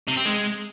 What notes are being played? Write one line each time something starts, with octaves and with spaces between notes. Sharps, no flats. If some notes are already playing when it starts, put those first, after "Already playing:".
C3
C4
G#3